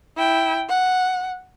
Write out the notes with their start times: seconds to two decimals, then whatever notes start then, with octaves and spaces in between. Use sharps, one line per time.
0.17 E4 G5
0.68 F#5